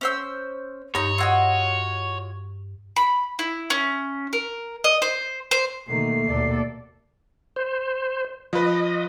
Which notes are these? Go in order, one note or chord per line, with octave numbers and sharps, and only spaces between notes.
C#4 C5 E6
G2 D#4 C#5 A#5
F4 F#4 D#5 E6 G#6
B5
E4
C#4
A#4
D#5
C5
C5
B2 D#3 A3 A#3 C7
D#2 B2 A4 D5
C5
F3 B4 D#5